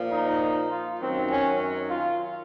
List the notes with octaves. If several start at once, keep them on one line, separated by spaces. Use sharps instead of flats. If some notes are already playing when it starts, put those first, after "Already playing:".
Already playing: A#2 F3
D#4
F4
F#2 D#3 F#3 C4
C#4
F4